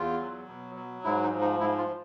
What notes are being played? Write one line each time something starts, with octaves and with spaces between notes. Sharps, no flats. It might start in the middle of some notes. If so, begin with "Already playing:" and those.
Already playing: E2 F4
F#3
B2
F#3
G#2 E4
D#4
F3
D#4
G#2 E4
F4